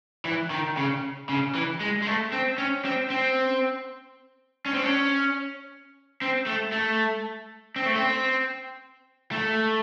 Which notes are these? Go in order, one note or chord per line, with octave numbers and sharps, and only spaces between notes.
E3
D#3
C#3
C#3
E3
G#3
G#3
A3
C4
C#4
C4
C4
C#4
C4
C#4
C4
A3
A3
C4
A3
C4
A3